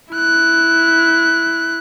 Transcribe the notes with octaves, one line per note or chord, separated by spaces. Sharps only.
E4 F#6